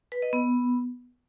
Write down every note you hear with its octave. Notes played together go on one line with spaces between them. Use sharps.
B4
D#5
B3